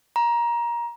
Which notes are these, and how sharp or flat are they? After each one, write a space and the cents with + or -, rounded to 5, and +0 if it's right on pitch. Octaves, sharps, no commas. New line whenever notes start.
A#5 +20